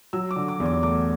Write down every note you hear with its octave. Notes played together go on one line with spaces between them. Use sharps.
F#3 E6
D6
D3
D6
E2
D6
A3 D6